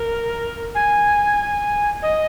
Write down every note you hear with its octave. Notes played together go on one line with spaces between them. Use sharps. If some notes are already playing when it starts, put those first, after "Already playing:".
Already playing: A#4
G#5
D#5